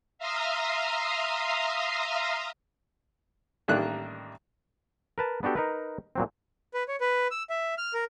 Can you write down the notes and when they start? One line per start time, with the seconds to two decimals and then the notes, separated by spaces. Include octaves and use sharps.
0.18 E5 F5 A#5 C6 D#6 F6
3.68 A1 D#3 G3 A#3 D4 F#6
5.18 A#4 B4 A5
5.43 B3 D4 F#4 G4 A4
5.56 D#4 A#4 B4
6.15 A#2 F#3 C4
6.74 B4
6.88 C#5
7.01 B4
7.31 E6
7.50 E5
7.78 F6
7.94 A#4